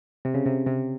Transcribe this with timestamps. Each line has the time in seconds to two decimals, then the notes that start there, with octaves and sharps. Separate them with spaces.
0.25 C3
0.34 C#3
0.46 C3
0.66 C3